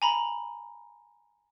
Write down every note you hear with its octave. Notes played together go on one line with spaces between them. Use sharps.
G#5 A#5 B5